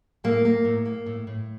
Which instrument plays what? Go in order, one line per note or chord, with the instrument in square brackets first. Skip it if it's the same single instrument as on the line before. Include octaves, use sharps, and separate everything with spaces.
[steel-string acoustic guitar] A2 A#3
A#3
A2
A#3
A2
A2